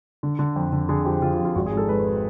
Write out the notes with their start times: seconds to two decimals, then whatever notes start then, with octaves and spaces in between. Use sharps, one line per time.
0.23 D3
0.39 D3
0.56 F2
0.72 D3
0.89 D3 G#4
1.05 F3 G4
1.22 D3 F4
1.33 F4
1.39 F2
1.45 F4
1.55 G#1 F#4
1.66 G#4
1.73 G#2 A4
1.89 G#3 B4